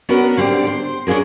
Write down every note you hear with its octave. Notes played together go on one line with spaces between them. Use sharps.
B3 C#4 D4 F#4 A#4
D3 C4 G4 D5
C5
C#4 D4 F4 G#4 A#4